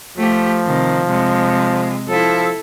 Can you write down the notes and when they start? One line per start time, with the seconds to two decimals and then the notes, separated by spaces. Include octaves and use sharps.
0.17 F3 A3 G4
0.66 C3 D#3
1.07 C3 G#3
2.08 F3 E4 A4